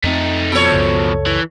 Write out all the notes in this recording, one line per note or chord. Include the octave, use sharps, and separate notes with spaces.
F2 A3 C4 D#4
B2 F3 A4 C#5
C#2 F#2 C#3
E3